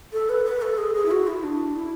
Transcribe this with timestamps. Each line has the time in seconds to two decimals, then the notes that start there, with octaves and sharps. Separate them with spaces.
0.13 A4
0.29 B4
0.45 B4
0.62 A4
0.78 G#4
0.95 G#4
1.05 E4
1.11 F#4
1.27 E4
1.43 D4
1.76 E4